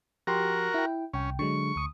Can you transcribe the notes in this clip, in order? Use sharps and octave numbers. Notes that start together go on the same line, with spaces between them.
F3 F#4 G4 A#4 C6
E4 G5
C2 C#4 G5
D3 F#3 G#3 C#6
D2 D#6